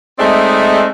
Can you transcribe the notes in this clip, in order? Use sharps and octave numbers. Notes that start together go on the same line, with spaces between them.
G#3 A3 C4 D#4 D5 E5